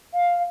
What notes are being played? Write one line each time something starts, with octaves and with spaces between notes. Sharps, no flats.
F5